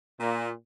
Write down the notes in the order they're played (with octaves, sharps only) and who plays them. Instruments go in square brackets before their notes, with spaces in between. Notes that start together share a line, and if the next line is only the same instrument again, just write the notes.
[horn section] A#2